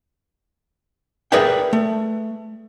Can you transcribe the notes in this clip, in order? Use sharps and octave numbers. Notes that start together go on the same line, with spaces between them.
G#4 A#4 B4 D5 E5 G5
A3